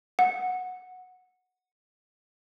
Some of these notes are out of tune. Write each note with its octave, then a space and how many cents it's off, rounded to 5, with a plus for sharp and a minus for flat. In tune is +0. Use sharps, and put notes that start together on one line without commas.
F#5 -10